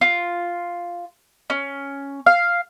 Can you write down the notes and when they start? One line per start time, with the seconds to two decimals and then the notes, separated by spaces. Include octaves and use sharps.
0.01 F4
1.50 C#4
2.26 F5